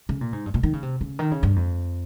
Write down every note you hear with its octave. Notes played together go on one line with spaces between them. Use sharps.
C#3
A#2
G#2
G2
A#2
D#3
C#3
C3
C#3
D#3
C#3
G2
F2